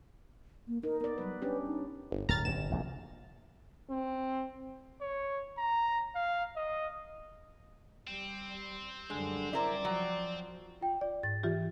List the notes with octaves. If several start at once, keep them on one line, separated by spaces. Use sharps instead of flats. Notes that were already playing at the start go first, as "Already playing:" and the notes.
A#3
D#4 A#4
B3 A#4 D5
F#3 G3 B4
C#4 D4 G4 B4
D#4
G1
D1 G2 A#5 F6 A6
G1 F#2 E7
F1 A#1 E2
C4
C#5
A#5
F5
D#5
G3 C4
F#2 D3 G3 G#3
E4 A#4 C5 D5
F3 F#3
F4 G5
D5
G#2 A6
E3 F4 G4